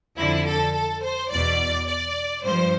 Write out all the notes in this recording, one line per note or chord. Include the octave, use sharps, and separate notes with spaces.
F2 D3 F3 E4
A4
A4
C5
E2 B2 D5
D5
G2 F3 C5